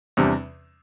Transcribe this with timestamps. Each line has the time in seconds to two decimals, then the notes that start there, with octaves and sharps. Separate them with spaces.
0.17 E2 C3 G3 D4